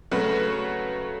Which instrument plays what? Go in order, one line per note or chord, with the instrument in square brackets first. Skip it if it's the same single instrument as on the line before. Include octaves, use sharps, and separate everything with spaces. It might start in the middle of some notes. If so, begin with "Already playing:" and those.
[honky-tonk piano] C#3 F#3 A3 F#4 B4